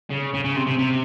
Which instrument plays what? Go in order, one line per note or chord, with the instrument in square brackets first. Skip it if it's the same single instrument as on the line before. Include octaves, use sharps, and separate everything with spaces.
[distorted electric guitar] C#3
C#3
C#3
C3
C3
C3